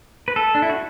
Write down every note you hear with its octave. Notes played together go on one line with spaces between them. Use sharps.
B4
A4
D4
E4
F#4